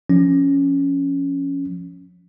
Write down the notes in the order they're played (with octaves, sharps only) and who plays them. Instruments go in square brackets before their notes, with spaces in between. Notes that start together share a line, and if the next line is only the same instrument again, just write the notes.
[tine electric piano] F3 C#4